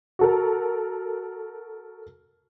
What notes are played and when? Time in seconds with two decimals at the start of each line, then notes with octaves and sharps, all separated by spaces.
0.19 F#4 A4 A#4